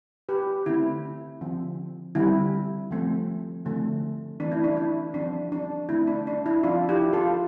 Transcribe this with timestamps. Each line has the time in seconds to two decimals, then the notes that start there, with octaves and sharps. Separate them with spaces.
0.29 G4 B4
0.66 D3 A3 C4 E4
1.41 D3 F3 C4
2.15 D3 G3 C4 E4
2.91 F3 A3 C4
3.65 D3 F3 A3 C4
4.40 E3 A3 C4 D4
4.52 E4
4.64 D4
4.77 E4
5.14 F3 C4 D4
5.52 D4
5.89 D3 A3 C4 E4
6.07 D4
6.27 D4
6.46 E4
6.63 F3 C4 D4 F4
6.89 E4 G4
7.13 F4 A4